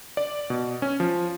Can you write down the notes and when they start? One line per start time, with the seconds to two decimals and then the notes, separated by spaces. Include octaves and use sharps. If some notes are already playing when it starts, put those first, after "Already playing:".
0.17 D5
0.50 B2
0.82 C#4
1.00 F3